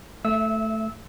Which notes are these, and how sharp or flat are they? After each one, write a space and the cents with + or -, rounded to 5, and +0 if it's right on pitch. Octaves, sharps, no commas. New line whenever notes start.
A3 +0 E5 +25 E6 -20